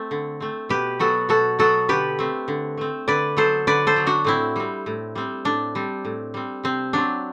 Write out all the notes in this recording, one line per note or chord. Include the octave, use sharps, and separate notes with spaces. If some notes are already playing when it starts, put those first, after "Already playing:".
Already playing: A3 C4
D3
A3 C4
B2 G4 B4
F#3 B3 F#4 A4
B2 F#4 A4
F#3 B3 F#4 A4
D3 G4 B4
A3 C4
D3
A3 C4
D3 B4 D5
F#3 B3 A4 C5
D3 B4 D5
A4 C5
F#3 B3
D4 F#4
A2 C4 E4
G3 C4
A2
G3 C4
A2 D4
G3 C4
A2
G3 C4
C3 C4
F#3 C4 D4